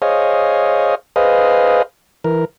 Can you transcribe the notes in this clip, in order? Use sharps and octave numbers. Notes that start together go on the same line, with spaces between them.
G#4 C5 C#5 D#5 F5
G#4 B4 C5 D#5 F5
E3 A#4